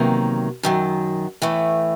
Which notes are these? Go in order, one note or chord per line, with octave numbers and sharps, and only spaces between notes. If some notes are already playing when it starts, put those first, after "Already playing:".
Already playing: E2 C3 D#3 F#3 A#3
F#2 D#3 F#3
A2 E3 A3